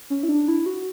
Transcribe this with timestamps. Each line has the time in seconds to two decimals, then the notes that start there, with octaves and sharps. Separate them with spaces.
0.10 C#4
0.23 E4
0.29 D4
0.48 E4
0.66 F#4